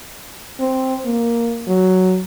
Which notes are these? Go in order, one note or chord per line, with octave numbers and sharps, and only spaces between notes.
C4
A#3
F#3